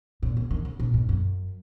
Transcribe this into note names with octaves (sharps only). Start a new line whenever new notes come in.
A#2
C#3
D#3
C#3
A#2
G#2
F#2